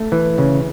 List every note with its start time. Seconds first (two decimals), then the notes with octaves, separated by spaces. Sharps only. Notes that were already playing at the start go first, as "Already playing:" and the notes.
Already playing: A3
0.12 E3
0.38 C#3